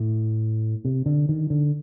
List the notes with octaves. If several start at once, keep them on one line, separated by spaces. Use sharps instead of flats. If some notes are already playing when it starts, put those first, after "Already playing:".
Already playing: A2
C3
D3
D#3
D3